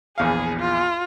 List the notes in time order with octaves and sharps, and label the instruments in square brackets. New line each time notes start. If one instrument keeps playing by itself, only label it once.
[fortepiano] A#1 E2 F5 [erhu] G#4
[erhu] F4